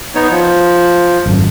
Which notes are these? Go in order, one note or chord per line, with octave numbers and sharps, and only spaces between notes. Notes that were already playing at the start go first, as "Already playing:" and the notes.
B3 D#4 C#5
F3
G#1 F#2